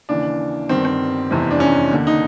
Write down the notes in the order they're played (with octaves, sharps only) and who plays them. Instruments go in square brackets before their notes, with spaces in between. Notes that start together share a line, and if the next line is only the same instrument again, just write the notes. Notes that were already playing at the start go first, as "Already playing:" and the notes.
[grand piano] D#2 C#3 E3 D4
G1 G2 D#3 C4
C4
F1 E2 C3 E3
D4
C#4
D#2 D3
D#4